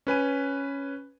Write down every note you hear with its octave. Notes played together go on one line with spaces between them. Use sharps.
C#4 B4 G#5 D#7